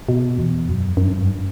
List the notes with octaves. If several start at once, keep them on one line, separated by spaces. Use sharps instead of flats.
B2
E2
F#2
F#2
G2
F#2
G2